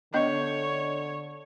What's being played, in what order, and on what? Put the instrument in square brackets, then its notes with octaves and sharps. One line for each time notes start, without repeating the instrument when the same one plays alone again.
[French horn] D3 [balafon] B3 D4 D#5 [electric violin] C#5